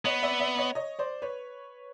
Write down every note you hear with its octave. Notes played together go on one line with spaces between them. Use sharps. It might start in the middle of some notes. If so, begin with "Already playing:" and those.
B3 C#5 D#5
D5 E5
D5 E5
C#5 D#5
C#5 D#5
C5 D5
B4 C#5